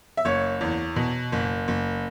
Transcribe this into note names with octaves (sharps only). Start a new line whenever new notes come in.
E5
F#1 C#5
E2
B2
F#1
F#1